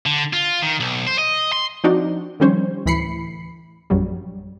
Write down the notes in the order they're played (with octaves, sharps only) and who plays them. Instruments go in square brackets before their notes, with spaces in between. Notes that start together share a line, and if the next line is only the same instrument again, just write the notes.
[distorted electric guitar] D3
F4
D#3
B1
C5
D#5
C6
[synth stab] F3 C4 D4 D#4 F#4 D5
D#3 F3 G3 C#4 C5 C#5
D2 A2 E3 B5 C7 C#7
A#1 F#2 F#3 G3